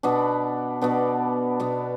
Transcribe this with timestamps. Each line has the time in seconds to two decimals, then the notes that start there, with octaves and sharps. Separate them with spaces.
0.03 B2 B3 D4
0.82 B2 B3 D4
1.60 B2 B3 D4